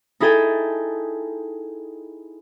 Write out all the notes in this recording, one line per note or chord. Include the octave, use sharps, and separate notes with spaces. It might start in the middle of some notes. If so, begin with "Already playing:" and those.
D#4 E4 G#4 A4 G5 G#5